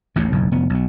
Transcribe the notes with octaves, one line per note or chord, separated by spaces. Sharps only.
A1 D#2 A2
F#1 B1 E2
F1 B3
B1 B2